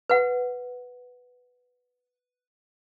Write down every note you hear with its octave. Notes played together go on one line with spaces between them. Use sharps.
B4 F#5